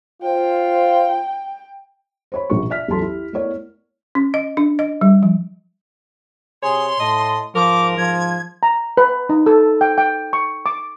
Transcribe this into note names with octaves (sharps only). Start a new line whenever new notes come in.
F4 C5 F5 G5
C5 C#5 B5
A#1 B2 A#3 A#4 C#6
D5 E5 F6 B6
A1 E2 F#3 A4 A5 C6
E4 G4
A3 B3 E4 A#4 C#5 D5
C#4
D#5
D4
D#5
G3
F3
C3 G#4 C#5 C6
A2 D#5 A5
G#2 F3 A#4 D6
F3 G#6
A#5
B4
D#4
A4
G5
G5
C#6
D6